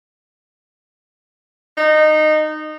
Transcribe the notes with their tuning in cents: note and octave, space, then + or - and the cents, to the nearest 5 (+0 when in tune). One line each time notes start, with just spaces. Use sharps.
D#4 -15